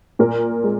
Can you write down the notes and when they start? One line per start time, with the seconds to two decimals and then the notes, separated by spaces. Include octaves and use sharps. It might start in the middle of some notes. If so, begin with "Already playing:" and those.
0.19 A#2 A#4
0.64 G#3